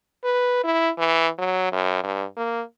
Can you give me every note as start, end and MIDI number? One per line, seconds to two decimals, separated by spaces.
0.24 0.60 71
0.64 0.89 64
0.98 1.28 52
1.39 1.68 54
1.72 2.00 42
2.03 2.24 43
2.37 2.62 58